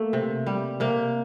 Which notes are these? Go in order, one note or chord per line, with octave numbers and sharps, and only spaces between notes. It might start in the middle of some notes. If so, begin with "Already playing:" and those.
Already playing: A3 A#3
C3
G3
C3 A#3